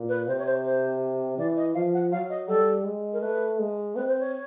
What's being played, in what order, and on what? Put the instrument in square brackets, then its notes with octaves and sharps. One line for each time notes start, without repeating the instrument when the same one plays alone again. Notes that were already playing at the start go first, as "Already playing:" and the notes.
Already playing: [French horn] A#2
[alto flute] B4
[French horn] C3 [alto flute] C5
[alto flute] C#5
C5
C5
[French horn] E3 [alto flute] D5
[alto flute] D#5
[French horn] F3 [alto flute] F5
[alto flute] F#5
[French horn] F#3 [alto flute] F5
[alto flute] D#5
[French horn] G3 [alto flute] A4
[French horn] G#3
[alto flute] A#4
[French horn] A3 [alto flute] B4
[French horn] G#3
[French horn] C4 [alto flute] B4
[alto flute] C5
C#5